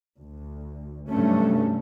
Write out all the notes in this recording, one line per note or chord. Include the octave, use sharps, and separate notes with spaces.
D2
G2 C3 F#3 A3 C#4